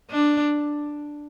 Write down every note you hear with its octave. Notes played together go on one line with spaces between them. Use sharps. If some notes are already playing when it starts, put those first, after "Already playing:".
D4